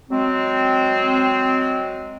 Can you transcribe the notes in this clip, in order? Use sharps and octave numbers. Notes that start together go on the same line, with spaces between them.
F#3 G#3 C4